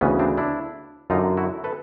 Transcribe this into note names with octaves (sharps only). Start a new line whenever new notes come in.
D2 C#3 E3 B3 C#4
C4 D4
D4 E4
F#2 D3 D#4 F4
E4 F#4
A4 B4